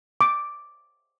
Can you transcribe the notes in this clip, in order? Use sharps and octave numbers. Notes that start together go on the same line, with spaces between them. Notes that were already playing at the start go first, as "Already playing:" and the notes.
D6